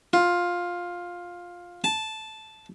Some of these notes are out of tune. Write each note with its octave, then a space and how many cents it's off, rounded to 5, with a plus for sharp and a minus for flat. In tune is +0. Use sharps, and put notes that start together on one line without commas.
F4 +10
A5 -10